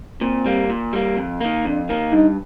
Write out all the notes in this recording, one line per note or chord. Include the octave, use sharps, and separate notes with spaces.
A#2 C4
G3 A#3
A#2
G3 A#3
F2
D#3 A#3
F2 D4
D#3 A#3
G2 D#4